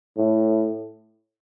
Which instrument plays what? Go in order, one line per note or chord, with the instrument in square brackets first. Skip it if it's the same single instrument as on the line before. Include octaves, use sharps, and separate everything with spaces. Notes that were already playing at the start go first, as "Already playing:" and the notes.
[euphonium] A2